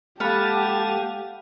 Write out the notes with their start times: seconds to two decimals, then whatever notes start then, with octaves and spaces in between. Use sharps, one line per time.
0.20 G#3 A#3 G4 A4 F5 F#5 A5 B5